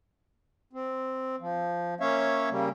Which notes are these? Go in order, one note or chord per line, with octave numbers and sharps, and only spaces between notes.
C4
F3
A#3 C#4 C#5 E5 F5
C#3 G3 A#3